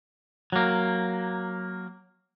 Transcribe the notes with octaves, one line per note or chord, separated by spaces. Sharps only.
F#3 A#3